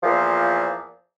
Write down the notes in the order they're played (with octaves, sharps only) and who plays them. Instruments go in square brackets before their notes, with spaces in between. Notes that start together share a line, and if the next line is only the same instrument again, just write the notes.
[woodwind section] E2 A#2 F3